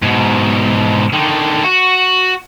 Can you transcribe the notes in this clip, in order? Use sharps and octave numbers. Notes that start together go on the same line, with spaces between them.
G#2 B2
D3 D#3
F#4